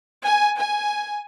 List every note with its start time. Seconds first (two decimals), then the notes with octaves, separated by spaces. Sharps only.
0.24 G#5
0.58 G#5